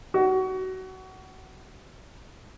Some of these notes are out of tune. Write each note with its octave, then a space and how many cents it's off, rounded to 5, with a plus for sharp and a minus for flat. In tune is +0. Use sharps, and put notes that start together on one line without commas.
F#4 +25